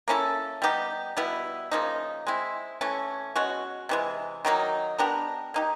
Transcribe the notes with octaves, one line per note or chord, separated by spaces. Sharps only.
A#3 C#4 E4 A4
G3 B3 D#4 G4
B2 G3 B3 E4
C#3 F3 A#3 D#4
G#3 C4 E4
E3 A3 C#4
B2 G#3 C#4 F#4
C3 E3 G#3
D#3 F#3 A#3 D#4
B3 D4 G4 A#4
A#3 D#4 G4